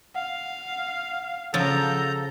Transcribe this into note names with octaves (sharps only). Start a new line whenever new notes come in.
F5 F#5
C#3 F3 A4 A#5 G6